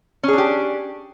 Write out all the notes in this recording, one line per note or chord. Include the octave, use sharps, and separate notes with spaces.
C#4 D4 G4 G#4